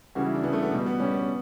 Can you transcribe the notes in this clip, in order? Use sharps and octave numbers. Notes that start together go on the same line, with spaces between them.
C#3 E3 G3 F#4
E4
D4
C#3 E3 G3 B3
A3
B3
B2 G3
B3
B2 G3 C#4
B3